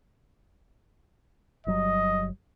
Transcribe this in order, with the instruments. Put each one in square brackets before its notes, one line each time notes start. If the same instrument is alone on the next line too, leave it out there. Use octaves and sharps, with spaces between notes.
[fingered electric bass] G1 F#3 G3 [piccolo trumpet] D#5